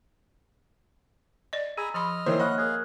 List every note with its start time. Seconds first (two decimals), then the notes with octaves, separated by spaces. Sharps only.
1.53 D5 D#5
1.78 G#4 G#5 A#5 B5 E6
1.94 F3 D#5 B5 F6
2.26 D#3 E3 A#3 C5 C#5 E5 D#6
2.40 D#5 F#5 B5 C#6 F6 F#6
2.58 G#4 A#4 F5 F#6 G#6